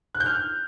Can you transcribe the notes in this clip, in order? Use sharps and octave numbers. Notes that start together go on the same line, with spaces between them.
F#6
G6
F6